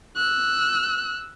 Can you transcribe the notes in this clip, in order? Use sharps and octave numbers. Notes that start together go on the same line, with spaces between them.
E6 F#6